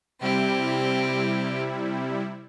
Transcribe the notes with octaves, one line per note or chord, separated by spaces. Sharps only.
C3 G3 C4 E4 G4